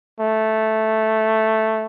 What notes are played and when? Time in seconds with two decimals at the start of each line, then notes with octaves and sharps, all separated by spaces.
0.20 A3